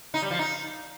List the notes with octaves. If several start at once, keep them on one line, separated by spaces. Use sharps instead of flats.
D#4
G3
F3
D#4